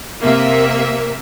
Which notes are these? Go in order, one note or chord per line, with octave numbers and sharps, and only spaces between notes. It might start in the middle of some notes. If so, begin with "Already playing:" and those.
C3 A#3 E5